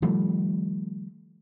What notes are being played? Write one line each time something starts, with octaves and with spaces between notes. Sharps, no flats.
D#3 F3 G3 A3